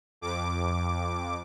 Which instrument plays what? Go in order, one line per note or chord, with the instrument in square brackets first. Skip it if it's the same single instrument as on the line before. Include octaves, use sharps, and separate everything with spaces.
[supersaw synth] F2 D6